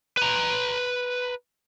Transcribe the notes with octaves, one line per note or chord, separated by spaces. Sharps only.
B4 A#5